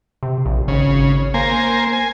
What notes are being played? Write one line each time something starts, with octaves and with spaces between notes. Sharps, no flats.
C3
A#1
G#1 C#3
A#3 A#4 C5 G#5
G#5